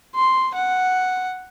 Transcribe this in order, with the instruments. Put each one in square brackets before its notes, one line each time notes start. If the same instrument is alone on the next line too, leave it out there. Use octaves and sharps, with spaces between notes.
[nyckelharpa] C6
F#5